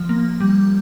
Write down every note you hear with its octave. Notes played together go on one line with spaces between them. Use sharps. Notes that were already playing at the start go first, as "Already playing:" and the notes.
Already playing: F3
A#3
G3